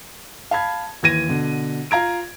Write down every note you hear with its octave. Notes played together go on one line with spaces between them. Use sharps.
F5 A5 B5 G#6
D#2 E3 G#6 A#6 D#7
B2 D3
F4 F5 A#5 G#6 D7